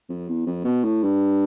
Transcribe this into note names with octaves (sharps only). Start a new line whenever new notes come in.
F2
E2
F2
B2
A2
G2